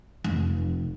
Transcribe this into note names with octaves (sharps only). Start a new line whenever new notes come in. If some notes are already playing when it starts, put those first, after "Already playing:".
F1